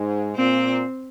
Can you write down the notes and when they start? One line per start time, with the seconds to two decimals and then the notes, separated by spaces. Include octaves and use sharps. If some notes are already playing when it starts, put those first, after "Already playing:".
Already playing: G#2
0.36 A#2 C4